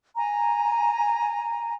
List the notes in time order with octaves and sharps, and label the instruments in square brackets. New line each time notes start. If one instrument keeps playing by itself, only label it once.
[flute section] G#5 A#5